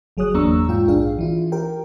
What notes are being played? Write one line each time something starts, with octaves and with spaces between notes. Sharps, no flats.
G1 F#3 G#4 C#5 D#6 F#6
E2 A#3 D4 A#5 C#6 E6
G#2 F4 G5
A#1 D4 G#4 F5
E3 E4 F4
G4 A#4 G5